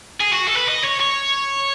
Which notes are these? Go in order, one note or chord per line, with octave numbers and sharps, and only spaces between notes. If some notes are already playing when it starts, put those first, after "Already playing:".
G#4
F#4
A4
B4
D#5
C#5
C#5